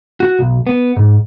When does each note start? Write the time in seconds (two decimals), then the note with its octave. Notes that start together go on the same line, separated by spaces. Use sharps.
0.20 F#4
0.39 B1
0.67 B3
0.97 G#2